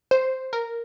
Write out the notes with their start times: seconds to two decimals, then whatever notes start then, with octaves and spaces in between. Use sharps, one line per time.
0.11 C5
0.53 A#4